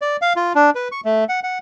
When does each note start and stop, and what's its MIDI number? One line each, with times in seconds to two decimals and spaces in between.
0.02 0.17 74
0.22 0.33 77
0.36 0.53 65
0.55 0.70 62
0.75 0.88 71
0.92 1.01 85
1.05 1.24 57
1.29 1.40 78
1.43 1.58 78